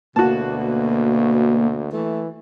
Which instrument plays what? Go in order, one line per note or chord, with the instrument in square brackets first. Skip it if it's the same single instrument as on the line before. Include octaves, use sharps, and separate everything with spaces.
[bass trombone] D2 [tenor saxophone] B2 [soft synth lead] A#3 [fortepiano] F#4 A5
[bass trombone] E3 [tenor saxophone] A3